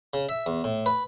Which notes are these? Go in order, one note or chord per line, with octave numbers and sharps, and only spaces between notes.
C#3
E5
E2
A2
B4